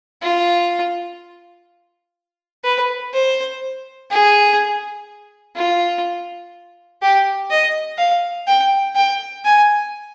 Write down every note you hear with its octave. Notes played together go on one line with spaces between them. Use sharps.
F4
B4
C5
G#4
F4
G4
D#5
F5
G5
G5
G#5